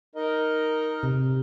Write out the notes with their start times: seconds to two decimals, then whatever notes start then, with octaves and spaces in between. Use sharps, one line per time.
0.15 D#4 A#4 D#5
1.03 C3